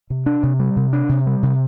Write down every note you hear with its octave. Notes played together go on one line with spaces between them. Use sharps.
C3
D4
C3
G3
C3
D4
C3
G3
C3